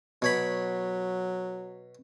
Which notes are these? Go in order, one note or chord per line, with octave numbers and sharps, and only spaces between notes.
B2 F#3 C#5 B5